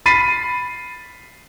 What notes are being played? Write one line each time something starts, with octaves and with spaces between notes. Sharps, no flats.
B5 A6 B6 C7 D#7